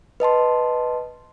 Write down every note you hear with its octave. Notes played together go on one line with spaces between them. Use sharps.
B4 D#5 A5 C6